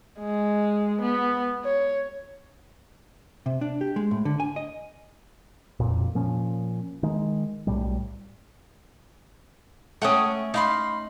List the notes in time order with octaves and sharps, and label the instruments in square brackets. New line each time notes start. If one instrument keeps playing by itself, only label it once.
[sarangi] G#3
B3
C#5
[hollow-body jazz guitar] C3
D4
G4
G#3
A2
D3
G#5
D#5
[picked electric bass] E1 F2 A#2
A#2 F3 C#4
D#3 G#3
B1 E2 A2 G3
[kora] A3 C#4 [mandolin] F#5 G5 D#6
[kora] D#4 [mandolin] F5 B5 C6